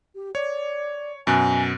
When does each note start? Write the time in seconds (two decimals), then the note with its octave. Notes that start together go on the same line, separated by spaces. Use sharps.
0.15 G4
0.35 C#5 D5
1.27 F#2 B2 G#5 F#6